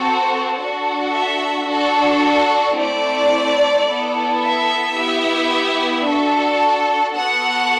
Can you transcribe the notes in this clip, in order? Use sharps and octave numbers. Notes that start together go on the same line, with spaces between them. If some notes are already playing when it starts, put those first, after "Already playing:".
Already playing: C4 F#4 A4
D4 F#4 A4
E5
D4 F#4 A4
A3 C4 E4 D5
B3 E4 A4
E5
B3 E4 G4
D4 F#4 A4
B3 F#4 A4 F#5